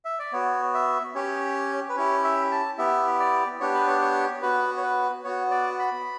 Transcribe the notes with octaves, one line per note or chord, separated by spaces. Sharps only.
E5
D5
B3 F#4 C#5
E5
C#4 G4 C#5
B4
C#4 E4 G4 C#5
E5
A5
B3 E4 G4 E5
D5
B3 D4 G4 C#5
B4
C#5
C#5
B3 F#4 B4
C#5
B4
B3 F#4 C#5
D5
B5